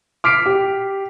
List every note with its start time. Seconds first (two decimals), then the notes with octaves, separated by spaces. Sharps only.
0.24 D6 F6 B6 C7 D7
0.46 G4